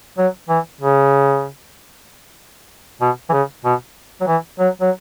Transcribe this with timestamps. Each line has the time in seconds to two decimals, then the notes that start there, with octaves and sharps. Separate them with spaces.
0.18 F#3
0.49 E3
0.81 C#3
3.01 B2
3.29 E3
3.33 C#3
3.65 B2
4.21 F#3
4.27 E3
4.59 F#3
4.81 F#3